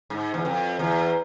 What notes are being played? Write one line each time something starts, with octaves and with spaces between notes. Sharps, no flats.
G#2
E2
F2
E2